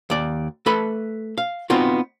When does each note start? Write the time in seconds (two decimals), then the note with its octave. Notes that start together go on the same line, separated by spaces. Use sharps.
0.10 D#2 D5
0.66 A3 A4 B4 B5
1.38 F5
1.70 B3 C4 D#4 F4 F#4